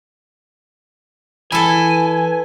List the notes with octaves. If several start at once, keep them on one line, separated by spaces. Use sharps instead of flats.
E3 E4 A4 B4 G#5